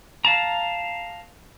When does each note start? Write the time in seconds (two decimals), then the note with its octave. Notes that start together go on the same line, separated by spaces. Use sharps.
0.25 F5 A5 A#5